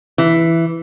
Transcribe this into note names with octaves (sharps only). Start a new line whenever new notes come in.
E3